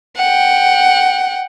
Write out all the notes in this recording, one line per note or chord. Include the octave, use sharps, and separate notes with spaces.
F#5 G5